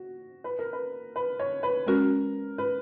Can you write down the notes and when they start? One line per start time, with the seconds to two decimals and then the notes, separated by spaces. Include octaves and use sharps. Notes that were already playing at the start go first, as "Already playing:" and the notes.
Already playing: F#4
0.44 B4
0.59 A#4
0.73 B4
1.16 B4
1.39 C#5
1.63 B4
1.86 G#3 C#4 F#4 A#4
2.58 B4